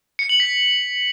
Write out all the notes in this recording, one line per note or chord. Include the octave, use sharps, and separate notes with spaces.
C#7
F#7
B6